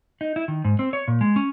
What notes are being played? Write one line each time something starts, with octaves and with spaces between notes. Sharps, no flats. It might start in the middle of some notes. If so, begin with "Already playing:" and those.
D#4
E4
D#3
G#2
C4
C#5
A#2
G#3
C#4